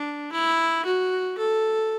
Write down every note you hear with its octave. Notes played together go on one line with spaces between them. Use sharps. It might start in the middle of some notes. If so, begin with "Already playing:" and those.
Already playing: D4
E4
F#4
A4